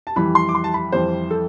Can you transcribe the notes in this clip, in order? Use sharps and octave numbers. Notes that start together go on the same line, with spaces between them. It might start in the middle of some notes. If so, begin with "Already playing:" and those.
A5
F2 E3 G3 B5
C6
D6
C6
A5
B5
F2 E3 G3 C5
A4